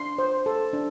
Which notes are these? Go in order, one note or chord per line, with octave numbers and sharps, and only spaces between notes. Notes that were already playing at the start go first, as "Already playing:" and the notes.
Already playing: D4 C6
C5
A4
D4